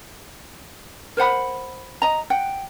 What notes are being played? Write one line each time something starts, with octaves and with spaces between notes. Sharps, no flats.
A#4 C5 F#5 B5
D#5 A#5
F#5 G5